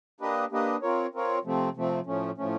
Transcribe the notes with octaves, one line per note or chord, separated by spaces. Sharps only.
A#3 D4 G4 B4 D#5
A#3 D4 G4 B4 D#5
C4 F4 A#4 C#5
C4 F4 A#4 C#5
C3 F3 A3 C4
C3 F3 A3 C4
A2 F3 A3 C#4
A2 F3 A3 C#4